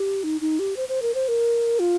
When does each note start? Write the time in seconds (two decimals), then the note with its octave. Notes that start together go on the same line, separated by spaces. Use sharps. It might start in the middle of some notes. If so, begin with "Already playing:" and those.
Already playing: G4
0.24 D#4
0.41 D#4
0.59 G4
0.76 C5
0.89 C5
1.02 A#4
1.14 C5
1.28 A#4
1.79 F4